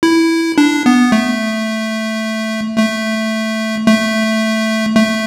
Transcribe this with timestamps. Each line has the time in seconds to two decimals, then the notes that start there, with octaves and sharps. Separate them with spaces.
0.03 E4
0.58 D4
0.86 B3
1.12 A3
2.78 A3
3.86 A3
4.96 A3